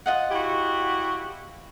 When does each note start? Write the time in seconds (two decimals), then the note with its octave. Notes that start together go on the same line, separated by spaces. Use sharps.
0.06 F4 D#5 F#5
0.31 E4 F#4 G4